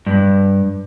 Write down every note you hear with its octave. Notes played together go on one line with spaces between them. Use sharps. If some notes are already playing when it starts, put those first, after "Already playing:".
G2